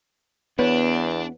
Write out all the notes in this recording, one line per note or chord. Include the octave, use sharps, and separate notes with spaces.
E2 B3 D4 B4 C#5